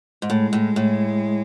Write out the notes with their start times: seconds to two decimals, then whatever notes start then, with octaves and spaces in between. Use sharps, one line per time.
0.22 G#2
0.30 A2 G#3
0.53 A2
0.76 A2